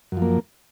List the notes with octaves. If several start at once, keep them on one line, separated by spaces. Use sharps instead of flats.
F#2 F3 A#3